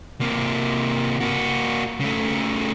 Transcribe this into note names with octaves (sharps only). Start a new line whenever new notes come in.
C3 A#3
A#3 F#4
C#3 A3